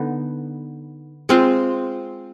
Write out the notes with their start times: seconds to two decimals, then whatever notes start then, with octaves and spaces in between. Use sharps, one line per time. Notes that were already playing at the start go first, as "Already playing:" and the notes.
Already playing: D3 B3 D#4
1.29 G#3 C4 F4